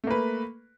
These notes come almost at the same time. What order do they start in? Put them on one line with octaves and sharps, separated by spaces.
A3 A#3 B4